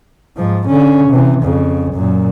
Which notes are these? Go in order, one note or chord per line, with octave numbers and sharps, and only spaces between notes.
G#2 F3
D3 C#4
C3 E3
F2 C#3
F#2 A#2